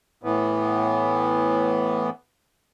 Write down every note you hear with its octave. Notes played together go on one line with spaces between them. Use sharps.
A2 E3 B3